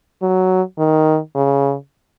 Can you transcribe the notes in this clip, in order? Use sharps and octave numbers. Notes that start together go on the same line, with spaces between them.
F#3
D#3
C#3